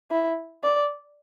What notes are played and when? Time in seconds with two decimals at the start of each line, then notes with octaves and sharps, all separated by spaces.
0.11 E4
0.63 D5